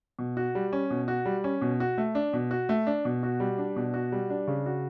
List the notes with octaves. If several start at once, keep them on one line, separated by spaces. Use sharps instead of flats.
B2
F#4
G3
C#4
B2
F#4
G3
C#4
B2
F#4
A3
D4
B2
F#4
A3
D4
B2
F#4
G3
D4
B2
F#4
G3
D4
C#3
F#4